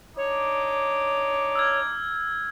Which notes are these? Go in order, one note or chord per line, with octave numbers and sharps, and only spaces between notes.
D4 D#4 C#5 D6
E6 F6 G#6